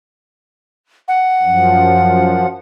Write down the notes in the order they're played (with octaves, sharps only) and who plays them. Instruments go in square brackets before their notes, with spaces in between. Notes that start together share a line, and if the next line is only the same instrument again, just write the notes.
[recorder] F#5
[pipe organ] F#2 F3